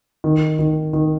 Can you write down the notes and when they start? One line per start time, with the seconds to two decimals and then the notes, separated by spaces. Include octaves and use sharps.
0.24 D#3
0.59 D#3
0.93 D#3